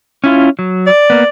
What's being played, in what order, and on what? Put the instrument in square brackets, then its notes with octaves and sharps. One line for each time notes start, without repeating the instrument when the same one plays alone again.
[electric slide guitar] C#4 E4 F4
F#3
[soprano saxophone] D5
[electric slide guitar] A#3 B3